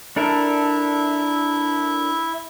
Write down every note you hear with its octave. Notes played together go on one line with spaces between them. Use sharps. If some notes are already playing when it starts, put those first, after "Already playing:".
D4 E4 A4 A#4 E5